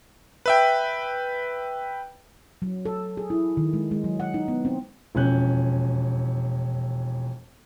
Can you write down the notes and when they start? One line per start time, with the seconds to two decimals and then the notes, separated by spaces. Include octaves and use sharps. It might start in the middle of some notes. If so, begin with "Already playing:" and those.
0.46 B4 E5 G5
2.62 F#3
2.85 A4
3.17 G#4
3.30 E4
3.57 D#3
3.73 G#3
3.91 G#3
4.04 F#3
4.20 F#5
4.34 D#4
4.48 B3
4.65 C4
5.15 E1 F2 C#4 F#6 G6